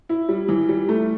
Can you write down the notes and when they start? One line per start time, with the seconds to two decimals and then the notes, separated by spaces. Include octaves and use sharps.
0.09 E4
0.29 G3
0.48 E3
0.69 G3
0.89 A3